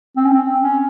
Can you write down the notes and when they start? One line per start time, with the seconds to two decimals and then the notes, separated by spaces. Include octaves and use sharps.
0.16 C4
0.25 C#4
0.32 C4
0.61 C#4